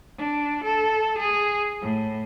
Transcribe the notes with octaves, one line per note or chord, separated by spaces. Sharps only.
D4
A4
G#4
A2